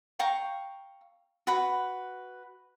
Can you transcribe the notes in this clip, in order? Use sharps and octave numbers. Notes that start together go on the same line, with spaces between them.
F5 G5 A#5 C#6
F#4 B4 B5